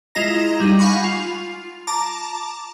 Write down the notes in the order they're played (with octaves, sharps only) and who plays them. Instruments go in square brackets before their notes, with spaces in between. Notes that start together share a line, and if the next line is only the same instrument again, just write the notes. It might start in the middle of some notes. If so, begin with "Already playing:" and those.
[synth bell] G#3 E4 F4 D#5 A#5 A#6
G3 D#4
F5 F#5 G#5 B5 C#6
F4
A5 A#5 D6